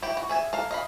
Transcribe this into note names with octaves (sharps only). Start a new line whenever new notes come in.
E4 G4 G5
F#4
G#4 E5 G#5
A4 A#4 F5
D#5 F5 B5